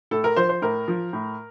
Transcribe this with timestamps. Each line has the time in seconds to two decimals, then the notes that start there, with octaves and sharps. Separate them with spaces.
0.11 A2 A4
0.24 A#4
0.36 F3 C5
0.49 C5
0.62 A2 A#4
0.88 F3
1.13 A2